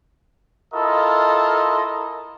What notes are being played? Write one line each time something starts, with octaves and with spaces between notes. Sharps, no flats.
E4 F4 A4 A#4 D#5